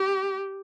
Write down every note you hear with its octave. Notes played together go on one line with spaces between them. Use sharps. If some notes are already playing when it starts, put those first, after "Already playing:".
Already playing: G4